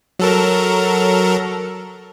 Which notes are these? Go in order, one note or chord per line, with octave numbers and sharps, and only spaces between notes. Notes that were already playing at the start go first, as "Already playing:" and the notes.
F#3 A4 A#4